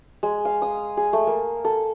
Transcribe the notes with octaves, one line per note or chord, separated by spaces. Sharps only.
G#3
F5
D#6
G#4
A3
A#3
A4